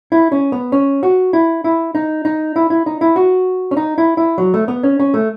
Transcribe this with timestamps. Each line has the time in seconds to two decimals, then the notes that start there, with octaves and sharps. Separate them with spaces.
0.12 E4
0.32 C#4
0.52 B3
0.72 C#4
1.03 F#4
1.33 E4
1.64 E4
1.95 D#4
2.25 D#4
2.56 E4
2.70 E4
2.86 D#4
3.01 E4
3.16 F#4
3.71 C#4
3.77 D#4
3.98 E4
4.17 E4
4.38 F#3
4.54 A3
4.68 B3
4.83 C#4
5.00 C#4
5.14 A3